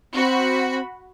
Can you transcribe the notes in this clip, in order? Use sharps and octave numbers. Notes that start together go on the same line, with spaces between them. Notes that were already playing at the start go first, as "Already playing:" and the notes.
C4 F#4 B5